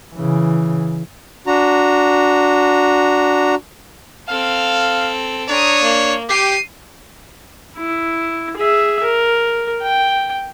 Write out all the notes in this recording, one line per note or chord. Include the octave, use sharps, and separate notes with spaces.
C#3 E3
D4 F#4 A#5
C4 A4 F5
D4 C#5 A#5 D#6
A#3
G4 C7 D#7
E4
G#4 E5
A#4
G5